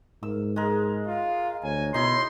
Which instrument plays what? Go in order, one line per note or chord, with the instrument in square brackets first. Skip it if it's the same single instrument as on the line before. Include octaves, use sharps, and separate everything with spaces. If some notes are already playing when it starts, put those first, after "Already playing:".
[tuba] G#2 [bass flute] A#4 [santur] E6
[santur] G#3 A#4 [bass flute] G#4
[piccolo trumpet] F4 [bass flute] F5
[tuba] D2 [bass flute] C#5 [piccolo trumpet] G#5
[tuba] B2 [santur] D#4 E4 [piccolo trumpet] C6